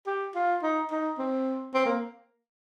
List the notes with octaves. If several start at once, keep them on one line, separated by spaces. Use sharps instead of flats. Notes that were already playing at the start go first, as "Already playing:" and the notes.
G4
F4
D#4
D#4
C4
C4
A#3